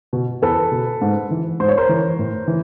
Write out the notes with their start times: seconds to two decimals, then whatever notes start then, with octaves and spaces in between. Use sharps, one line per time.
0.13 B2
0.42 E2 A4 B4
0.72 B2
1.01 G#2
1.31 E3
1.60 G#2 C5
1.68 C#5
1.78 A#4 C5
1.89 E3
2.19 A2
2.48 E3